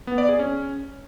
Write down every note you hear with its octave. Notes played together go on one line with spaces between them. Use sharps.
B3
D5
G#4
C#4